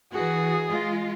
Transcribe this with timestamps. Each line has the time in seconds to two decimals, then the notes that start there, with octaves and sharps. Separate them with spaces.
0.13 E3 F#4 G#4
0.69 G#3 F4